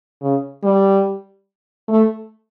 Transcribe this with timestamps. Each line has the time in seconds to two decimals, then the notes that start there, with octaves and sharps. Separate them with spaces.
0.22 C#3
0.63 G3
1.88 A3